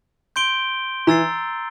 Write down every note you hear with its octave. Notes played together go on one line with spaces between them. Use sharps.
C6 G6 D7 G7
E3 A#5 E6 A6 C7